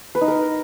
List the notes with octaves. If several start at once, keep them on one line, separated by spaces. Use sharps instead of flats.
B4
D#4
A#4